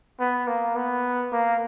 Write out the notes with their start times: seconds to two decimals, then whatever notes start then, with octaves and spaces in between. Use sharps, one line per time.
0.19 B3
0.47 A#3
0.76 B3
1.32 A#3